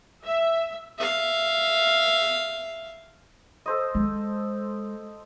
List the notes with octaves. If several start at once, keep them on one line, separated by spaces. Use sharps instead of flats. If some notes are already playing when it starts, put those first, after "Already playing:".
E5
E5 F5
A4 C5 D#5
G#3